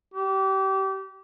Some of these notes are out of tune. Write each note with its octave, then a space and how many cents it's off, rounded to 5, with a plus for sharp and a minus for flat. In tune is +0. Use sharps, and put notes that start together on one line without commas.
G4 -30